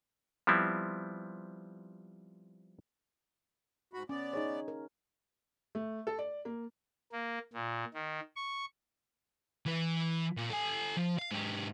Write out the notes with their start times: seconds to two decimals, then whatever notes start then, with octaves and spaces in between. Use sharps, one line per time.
0.47 F3 G3 B3 C4 E4
3.93 G#2 F#4 B5
4.09 B3 C#4 D5
4.33 D#4 G#4 C#5
4.68 A#4
5.75 A3
6.07 A4
6.19 D5
6.45 A#3
7.12 A#3
7.53 A#2
7.94 D#3
8.36 C#6
9.66 E3 B4
10.37 A#2
10.50 A4 G#5
10.97 F3
11.18 F5
11.31 G#2 G4